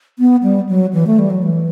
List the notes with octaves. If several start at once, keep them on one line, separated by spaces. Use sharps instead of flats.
B3
G3
F#3
E3
A3
G3
F#3
E3